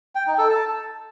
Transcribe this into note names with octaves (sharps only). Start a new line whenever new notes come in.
G5
D#4
A4
A5